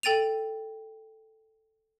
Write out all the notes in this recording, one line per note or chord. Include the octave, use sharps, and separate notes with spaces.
A4 G5 A6 D#7 F7